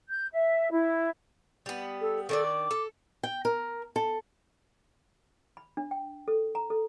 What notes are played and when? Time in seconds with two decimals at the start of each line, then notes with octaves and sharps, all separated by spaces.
0.09 G6
0.33 E5
0.70 E4
1.66 G3 B3
2.01 A4
2.29 D#3 D4 A4 D5
2.46 D6
2.71 A4
3.23 G5
3.45 A#4
3.96 A4
5.57 B5
5.77 D4
5.91 G5
6.28 A4
6.55 A#5
6.70 A4